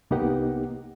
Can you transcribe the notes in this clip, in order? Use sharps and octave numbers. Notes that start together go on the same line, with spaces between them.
C2 A#3 B3 D#4 G4 F#5